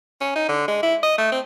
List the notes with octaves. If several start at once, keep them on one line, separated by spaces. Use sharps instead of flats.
C#4
D#4
D3
G#3
E4
D#5
A3
C4